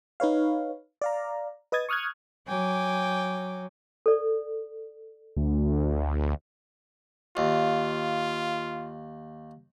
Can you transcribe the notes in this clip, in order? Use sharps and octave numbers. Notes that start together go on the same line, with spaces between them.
D#4 B4 C#5 F5
D5 F5 A#5
B4 D#5 D#6 G#6 A6
C#6 D#6 F6 F#6 G#6
F#3 G5 G#5 D6
A4 D5
D2
D#2 F4